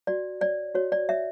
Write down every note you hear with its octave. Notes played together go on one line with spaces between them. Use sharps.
F#4 D5
C#5 D5
F#4 C#5
D5
C#5 E5